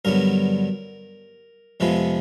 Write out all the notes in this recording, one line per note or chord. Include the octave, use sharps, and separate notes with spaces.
G2 D3 F#3 B3 A#4
F2 C3 F3 G#3 B3 B4